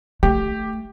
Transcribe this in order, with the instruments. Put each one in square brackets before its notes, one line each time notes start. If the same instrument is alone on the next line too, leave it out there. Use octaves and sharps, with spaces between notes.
[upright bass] A3 [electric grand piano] G4